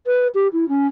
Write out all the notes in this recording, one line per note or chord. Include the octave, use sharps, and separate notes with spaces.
B4
G4
E4
C#4